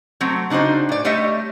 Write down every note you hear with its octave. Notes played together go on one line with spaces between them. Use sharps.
F#3 A3 C4
C#3 D4 D#4 F#4 C5
A2 D5
G3 A3 C#5 D#5 E5